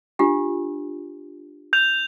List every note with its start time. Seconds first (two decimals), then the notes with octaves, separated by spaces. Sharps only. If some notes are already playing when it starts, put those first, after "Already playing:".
0.19 D4 F4 G4
1.73 G6 F7